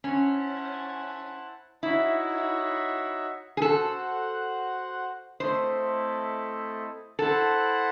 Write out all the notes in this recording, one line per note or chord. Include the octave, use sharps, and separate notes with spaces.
C#4 E4 C5 F#5 A5
D#4 E4 F#4 C#5 E5
G#4
F#4 A4 C5 F#5
A3 C4 E4 A4 C5 D#5
E4 A4 C5 F#5 A5